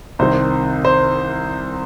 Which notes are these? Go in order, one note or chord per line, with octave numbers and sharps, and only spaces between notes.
C2 C3 D#3 C5
C5